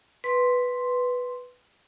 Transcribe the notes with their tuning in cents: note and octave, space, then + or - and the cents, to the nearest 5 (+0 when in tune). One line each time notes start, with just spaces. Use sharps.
B4 +0 C6 +0